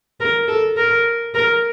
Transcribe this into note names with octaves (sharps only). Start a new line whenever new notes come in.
A#4
A4
A#4
A#4